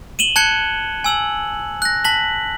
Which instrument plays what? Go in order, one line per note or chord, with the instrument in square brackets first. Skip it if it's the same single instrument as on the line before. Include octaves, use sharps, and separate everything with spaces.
[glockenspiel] D#7 E7 F#7 G7
A5 F#6 G#6 C#7 G7
G#5 E6 F#7
F#6 A#6
A5 B6 F#7